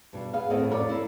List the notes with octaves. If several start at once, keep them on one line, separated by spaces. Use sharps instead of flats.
G2 B2 G3
B3 G#4 F5
D#2 A2 B3 C4 D#5 F5
F2 E4 A#4 C#5 D5
A#3 E4